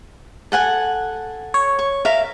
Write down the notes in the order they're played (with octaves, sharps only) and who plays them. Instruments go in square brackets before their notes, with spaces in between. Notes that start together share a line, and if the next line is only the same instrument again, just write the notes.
[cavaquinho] A4 F#5 G#5
[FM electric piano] C#5
[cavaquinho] C#6
A#4 E5 F5